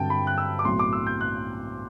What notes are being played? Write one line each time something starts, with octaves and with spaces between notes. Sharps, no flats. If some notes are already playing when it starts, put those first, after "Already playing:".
Already playing: G2 D3 F#3 C4 G5 A5
B5
F#6
E6
D6
B1 A2 F#3 C4 C6
D6
E6
G6
F#6